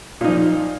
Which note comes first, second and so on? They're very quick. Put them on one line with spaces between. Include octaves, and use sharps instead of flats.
A#2 D#4 F3